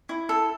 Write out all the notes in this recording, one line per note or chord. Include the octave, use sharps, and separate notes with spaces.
E4
A4